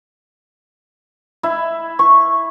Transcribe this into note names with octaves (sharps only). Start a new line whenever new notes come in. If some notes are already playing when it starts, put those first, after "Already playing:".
E4
C#6